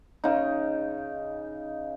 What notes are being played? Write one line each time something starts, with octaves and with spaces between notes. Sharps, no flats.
C#3 D#4